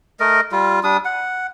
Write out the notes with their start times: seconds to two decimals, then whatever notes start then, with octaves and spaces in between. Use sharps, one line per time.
0.20 A3 A#4 D#5
0.52 G3 F4
0.84 G3 D4 D#6
1.05 F#5